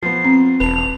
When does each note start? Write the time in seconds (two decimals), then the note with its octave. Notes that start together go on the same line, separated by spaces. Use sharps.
0.03 F3 B3 C7
0.24 C4
0.60 E1 B4 A5 F7